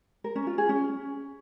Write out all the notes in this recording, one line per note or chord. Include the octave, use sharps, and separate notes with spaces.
A#4
C#4
F4
G#4
C#4